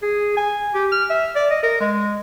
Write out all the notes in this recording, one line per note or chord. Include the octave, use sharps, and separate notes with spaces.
G#4
G#5
G4
F6
E5
D5
D#5
A#4
G#3